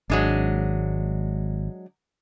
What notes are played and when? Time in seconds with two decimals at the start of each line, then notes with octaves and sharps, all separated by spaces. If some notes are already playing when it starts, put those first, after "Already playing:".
0.10 G#1 F#3 G#3 D4